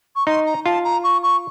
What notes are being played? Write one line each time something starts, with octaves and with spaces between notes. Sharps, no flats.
C#6
D#4 C6
A#5
F4 A5
A#5
C#6
C#6